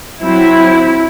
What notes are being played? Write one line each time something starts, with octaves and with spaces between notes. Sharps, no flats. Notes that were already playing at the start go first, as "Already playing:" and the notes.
F#3 C4 E4